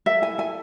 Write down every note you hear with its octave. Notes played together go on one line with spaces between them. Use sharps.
A4 E5
E4 G#5
A4 G#5